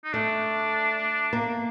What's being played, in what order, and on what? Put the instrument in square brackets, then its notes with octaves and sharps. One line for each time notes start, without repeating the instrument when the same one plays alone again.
[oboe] D#4
[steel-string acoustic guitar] A3 [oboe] D4
[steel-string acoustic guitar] A#3